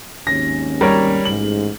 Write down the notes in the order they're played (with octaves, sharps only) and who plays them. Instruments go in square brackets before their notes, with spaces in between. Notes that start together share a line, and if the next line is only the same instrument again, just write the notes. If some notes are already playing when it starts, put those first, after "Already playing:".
[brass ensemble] G#1 D#2 C#4 [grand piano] A#6
[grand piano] G3 A#4 C#5
[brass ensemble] A1 G#2 [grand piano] F#7